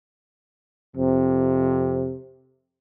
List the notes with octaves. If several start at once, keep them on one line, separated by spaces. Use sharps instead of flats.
F2 C3